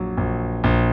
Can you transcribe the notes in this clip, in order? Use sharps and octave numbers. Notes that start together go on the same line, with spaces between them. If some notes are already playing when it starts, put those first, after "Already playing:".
Already playing: A#1 F#3
A#1
A#1